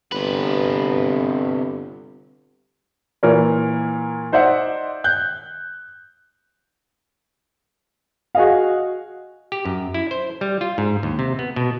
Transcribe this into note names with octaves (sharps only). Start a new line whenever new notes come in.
G1 C3 B4
A#2 E3 A#4 C#5
D#4 C5 D5 E5 F#5
F#6 G6
F#4 G#4 D#5 F5
G4
F#2
E4
C5
G3
F4
G#2
D#2
C3
B3
B2